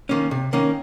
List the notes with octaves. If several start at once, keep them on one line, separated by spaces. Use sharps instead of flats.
D#3 A#3 C#4
C3
D#3 A#3 C#4